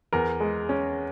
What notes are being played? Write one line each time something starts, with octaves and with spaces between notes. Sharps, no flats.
E2 A#4
G#3
C#4